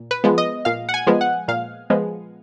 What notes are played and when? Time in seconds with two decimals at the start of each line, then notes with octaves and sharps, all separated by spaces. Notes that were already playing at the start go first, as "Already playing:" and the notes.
Already playing: A#2
0.11 B4
0.24 F3 G#3 B3
0.38 D#5
0.65 A#2 F5
0.89 F#5
0.94 G#5
1.07 F3 G#3 B3
1.21 F#5
1.48 A#2 F5
1.90 F3 G#3 B3